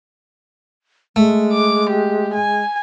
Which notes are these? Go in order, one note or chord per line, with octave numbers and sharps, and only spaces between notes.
G#3 A3
D6
G4
G#5